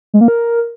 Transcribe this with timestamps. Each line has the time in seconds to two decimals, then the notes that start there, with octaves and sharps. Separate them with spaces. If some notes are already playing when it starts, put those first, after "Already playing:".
0.14 G#3
0.21 A#3
0.28 A#4